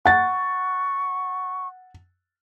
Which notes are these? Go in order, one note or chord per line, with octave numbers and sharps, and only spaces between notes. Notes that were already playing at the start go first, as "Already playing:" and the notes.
F#5 C#6 A6